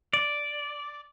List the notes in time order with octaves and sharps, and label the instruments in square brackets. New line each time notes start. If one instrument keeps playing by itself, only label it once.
[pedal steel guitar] D5